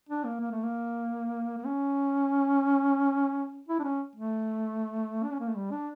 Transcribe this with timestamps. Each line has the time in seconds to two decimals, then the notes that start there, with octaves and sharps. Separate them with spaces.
0.09 D4
0.24 A#3
0.41 A#3
0.52 A3
0.63 A#3
1.58 A#3
1.65 C#4
3.68 E4
3.79 D4
3.84 C#4
4.15 A3
5.23 D4
5.31 C#4
5.39 A#3
5.48 A3
5.56 G3
5.72 D4